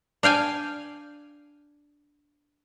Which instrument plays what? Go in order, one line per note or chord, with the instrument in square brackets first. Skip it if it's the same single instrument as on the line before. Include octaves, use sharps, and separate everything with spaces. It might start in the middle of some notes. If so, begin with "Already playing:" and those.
[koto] D4 F5 G5 G#5